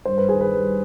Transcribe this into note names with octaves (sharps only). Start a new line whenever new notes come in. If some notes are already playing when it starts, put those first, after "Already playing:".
G2 C5
B4
D#3 G#4
B4
G3